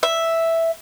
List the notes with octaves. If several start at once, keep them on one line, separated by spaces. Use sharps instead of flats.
E5